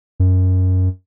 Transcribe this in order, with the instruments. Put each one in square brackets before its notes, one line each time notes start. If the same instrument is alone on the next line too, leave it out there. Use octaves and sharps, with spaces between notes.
[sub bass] F#2